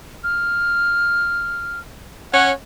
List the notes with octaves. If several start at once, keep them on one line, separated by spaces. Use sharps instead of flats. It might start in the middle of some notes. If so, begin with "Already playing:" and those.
F6
C#4 C#5 F#5